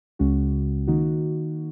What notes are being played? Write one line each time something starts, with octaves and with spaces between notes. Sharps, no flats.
C#2 C#3 G#3 C#4 F#4
D#3 A#3 D#4 F#4